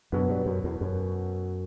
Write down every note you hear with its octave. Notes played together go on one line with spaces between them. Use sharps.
F#2 B2 F#3 B3
G2
F#2
E2
F#2